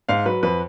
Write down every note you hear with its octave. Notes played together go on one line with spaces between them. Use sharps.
G#2 F5
F#3 B4
F2 B4